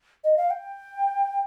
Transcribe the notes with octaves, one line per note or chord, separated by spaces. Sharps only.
D#5
F5
G5